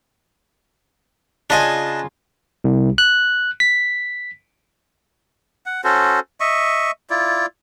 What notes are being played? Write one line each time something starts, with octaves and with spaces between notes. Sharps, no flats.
C#3 D4 F4 D#5 G#5
C2
F#6
B6
F#5
C#4 F#4 A4 C5
D#5 E5 C#6
E4 F4 D5